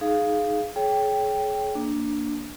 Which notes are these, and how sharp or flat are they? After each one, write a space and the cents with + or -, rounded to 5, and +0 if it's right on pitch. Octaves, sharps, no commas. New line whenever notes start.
D#4 -5 G#4 +15 F5 +0
G#4 +35 C#5 +0 G5 +0
A#3 +0 D4 +0